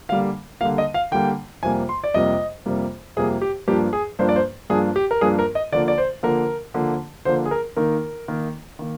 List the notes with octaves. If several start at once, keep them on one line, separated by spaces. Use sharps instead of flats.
D3 G3 A#3 F5
D3 G3 A#3 F5
D#5
F5
D3 G3 A#3 G5
F2 C3 G3 A#3 G#5
C6
D5
F2 C3 G3 A#3 D#5
F2 C3 G3 A#3
F2 C3 G3 A#3 G#4
G4
G2 F3 A#3 D4 G4
G#4
G2 F3 A#3 D4 C5
D5
C5
G2 F3 A#3 D4 G#4
G4
A#4
G2 F3 A#3 D4 G#4
A#4
D#5
D3 F3 A#3 D5
D5
C5
D3 F3 A#3 A#4
D3 F3 A#3
D3 F3 A#3 C5
G#4
A#4
D#3 A#3 D#4 A#4
D#3 A#3 D#4
D#3 A#3